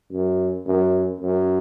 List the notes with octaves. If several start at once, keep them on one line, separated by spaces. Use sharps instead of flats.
F#2
F#2
F#2